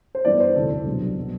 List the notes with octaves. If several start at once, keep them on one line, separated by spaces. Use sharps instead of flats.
C5
G2 E3 B3 E4 D5
C5
E1 D2 C3 E3 A3 A4
B1 B2 G3 D4
B2 F#3